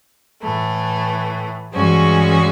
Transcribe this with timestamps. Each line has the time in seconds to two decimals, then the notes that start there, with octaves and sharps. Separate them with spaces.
0.41 A2 E3 A3
1.74 G2 E3 G#3 C#4 F#4